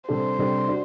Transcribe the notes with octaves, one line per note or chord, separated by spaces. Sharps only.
C3 G3 D4 A4 C5
C3 G3 D4 A4
D4 F#4